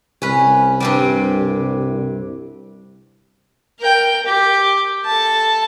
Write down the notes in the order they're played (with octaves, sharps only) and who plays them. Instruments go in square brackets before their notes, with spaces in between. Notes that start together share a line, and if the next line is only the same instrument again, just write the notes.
[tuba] C2 [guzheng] C#4 B4
[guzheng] G2 C3 G3
[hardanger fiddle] A#4 G5
G4
A4 A5